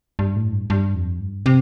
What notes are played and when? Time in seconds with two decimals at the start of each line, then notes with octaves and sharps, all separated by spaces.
0.19 G2
0.36 A2
0.53 G2
0.70 G2
0.95 F2
1.20 G2
1.46 C3